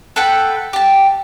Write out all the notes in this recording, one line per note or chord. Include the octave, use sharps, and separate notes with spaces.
A4 B4 F#5 G5
G4 A5